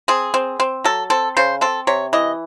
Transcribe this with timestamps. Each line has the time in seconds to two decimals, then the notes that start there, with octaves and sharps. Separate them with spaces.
0.08 C4 G#4
0.34 C4
0.60 C4
0.84 F#3 A4
1.10 C4 A4
1.37 C#3 C5
1.61 C4 A4
1.87 C3 C#5
2.13 E3 D#5